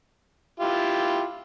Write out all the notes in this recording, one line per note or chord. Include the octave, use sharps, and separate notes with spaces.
E4 F4 G4